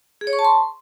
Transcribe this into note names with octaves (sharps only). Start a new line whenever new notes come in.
G#4
C#5
C#6
A5
C6